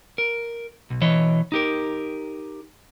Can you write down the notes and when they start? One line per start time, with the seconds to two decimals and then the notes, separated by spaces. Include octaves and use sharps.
0.18 A#4
0.90 B1
1.02 B2 E3 C#5 D#5
1.52 D#4 G4 A#4